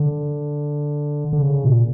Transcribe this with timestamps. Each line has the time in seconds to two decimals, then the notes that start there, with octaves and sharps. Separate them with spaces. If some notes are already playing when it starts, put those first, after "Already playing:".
Already playing: D3
1.33 D3
1.42 C#3
1.65 A#2